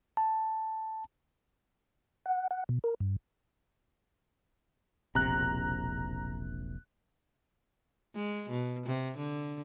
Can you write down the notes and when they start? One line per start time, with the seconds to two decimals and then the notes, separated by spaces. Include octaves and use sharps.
0.17 A5
2.26 F#5
2.51 F#5
2.69 B2
2.84 A#4
3.00 G2
5.15 E1 A#1 C3 A#5 F#6
8.15 G#3
8.50 B2
8.86 C3
9.18 D3